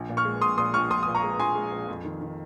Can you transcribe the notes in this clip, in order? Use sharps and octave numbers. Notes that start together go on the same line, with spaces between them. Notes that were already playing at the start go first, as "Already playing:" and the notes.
Already playing: A#1
A#2
C#6 F6
G#3
A#1 C6 D#6
A#2 C6 D#6
A#1 C#6 F6
A#1 C6 D#6
A#2 D#6
A#5 C#6
G#3
A#1 G#5 C6
G#3
A#1
F2
D#3
D#3